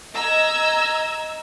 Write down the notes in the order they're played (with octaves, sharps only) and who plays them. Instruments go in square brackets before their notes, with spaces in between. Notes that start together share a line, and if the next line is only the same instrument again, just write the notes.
[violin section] D#5 A#5 E6 G#6